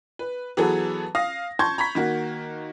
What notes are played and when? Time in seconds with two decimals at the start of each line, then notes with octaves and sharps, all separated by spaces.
0.19 B4
0.57 E3 F#3 B3 F#4 G#4 A4
1.15 F5 D#6 A#6
1.59 A5 C6 C#6 G6 G#6
1.78 A#5 B5 C#6 B6
1.95 D#3 A#3 F#4